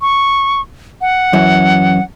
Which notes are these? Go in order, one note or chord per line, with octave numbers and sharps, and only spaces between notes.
C#6
F#5
F#2 E3